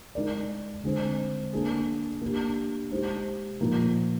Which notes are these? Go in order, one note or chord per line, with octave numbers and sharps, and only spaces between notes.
G#3 D#4 A#4 D5
D3 G#3 C4
A#3 D4 G#4
A#3 D4 G4
G#3 D#4 G4 C5
A#2 F3 A#3 D#4